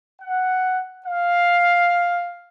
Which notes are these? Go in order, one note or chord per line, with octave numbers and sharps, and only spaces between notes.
F#5
F5